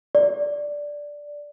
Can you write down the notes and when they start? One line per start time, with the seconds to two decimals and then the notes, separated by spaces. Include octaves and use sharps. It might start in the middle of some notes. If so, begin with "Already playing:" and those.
0.15 D5